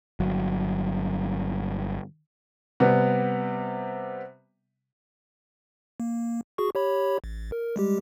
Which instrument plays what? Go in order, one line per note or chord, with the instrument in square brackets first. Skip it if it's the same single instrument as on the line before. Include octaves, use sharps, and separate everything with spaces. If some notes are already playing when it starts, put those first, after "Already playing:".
[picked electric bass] G1 F#3
[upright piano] C3 G3 B3
[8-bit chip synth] A#3
F#4 G#4 C#6
G4 C#5 B5
A1
A#4
G3 G#3 G4